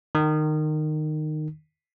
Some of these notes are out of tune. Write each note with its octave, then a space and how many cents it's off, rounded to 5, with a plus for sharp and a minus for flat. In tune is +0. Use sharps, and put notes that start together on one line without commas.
D#3 -20